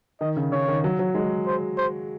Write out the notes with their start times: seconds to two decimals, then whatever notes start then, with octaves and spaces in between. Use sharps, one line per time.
0.21 D#3 D#5
0.37 C#3
0.52 C#3 C#5
0.68 D#3
0.84 F#3
0.99 F#3
1.15 G#3
1.47 C5
1.78 C5